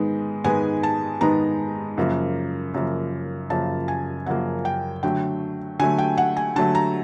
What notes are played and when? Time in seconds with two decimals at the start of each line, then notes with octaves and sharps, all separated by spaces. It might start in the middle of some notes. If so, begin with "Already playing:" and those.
Already playing: G#2 D#3 G#3 B3
0.44 G#2 D#3 G#3 B3 G#5
0.83 A5
1.21 G#2 D#3 G#3 B3 A#5
1.98 F#2 C#3 F3 A#3
2.74 F#2 C#3 F3 A#3
3.50 F#2 C#3 F3 A#3 A5
3.88 G#5
4.26 F#2 C#3 F3 A#3 F#5
4.65 G5
5.03 D3 F#3 A3 G5
5.79 D3 F#3 A3 G#5
5.98 G5
6.18 F#5
6.37 G#5
6.56 D3 F#3 A3 A5
6.75 A#5